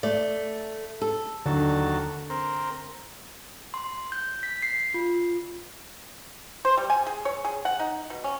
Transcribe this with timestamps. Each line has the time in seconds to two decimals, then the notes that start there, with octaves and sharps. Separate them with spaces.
0.03 A3 D5
1.02 A4
1.46 D#2 D3 F#3 A5
2.30 C4 A#4
3.74 C6
4.12 G6
4.43 B6
4.62 C7
4.94 F4
6.65 C5
6.77 G3
6.90 G#5
7.07 G#4
7.25 C#5
7.45 G#4
7.65 F#5
7.80 D#4
8.10 B2
8.24 C#4